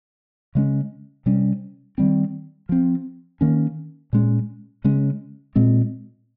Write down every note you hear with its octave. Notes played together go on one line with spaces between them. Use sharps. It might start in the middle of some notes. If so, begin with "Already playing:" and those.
C#3 G#3 C#4
C3 G3 C#4
D#3 G3 C4
F3 C4
D#3 A#3 C#4
A#2 G#3 C#4
C#3 G#3 C#4
A#2 G#3 C4